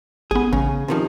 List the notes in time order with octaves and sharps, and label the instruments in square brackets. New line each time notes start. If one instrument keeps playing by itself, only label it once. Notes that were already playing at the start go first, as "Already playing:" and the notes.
[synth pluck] G#1 B3 [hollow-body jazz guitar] G#4
[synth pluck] A1 [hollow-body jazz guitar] C#3
[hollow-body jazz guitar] C3 D#3 F3